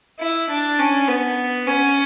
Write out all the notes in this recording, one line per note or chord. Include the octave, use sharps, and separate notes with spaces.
E4
D4
C#4
B3
C#4